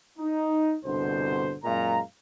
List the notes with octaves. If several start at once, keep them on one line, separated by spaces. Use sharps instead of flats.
D#4
G1 C2 B2 D3 C5
F#2 A#2 G#3 F5 A#5